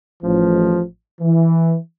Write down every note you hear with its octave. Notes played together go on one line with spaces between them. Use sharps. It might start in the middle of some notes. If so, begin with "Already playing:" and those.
A1 F3
E3